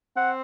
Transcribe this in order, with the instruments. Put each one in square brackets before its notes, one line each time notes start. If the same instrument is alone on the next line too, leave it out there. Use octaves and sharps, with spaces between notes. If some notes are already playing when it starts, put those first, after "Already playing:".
[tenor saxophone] C4 [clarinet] F#5